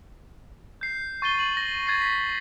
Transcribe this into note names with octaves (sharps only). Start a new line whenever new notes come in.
G6 C7
C#6 A6 D#7 G7
F#7
A#6
G#6 A6 C7 D#7
B6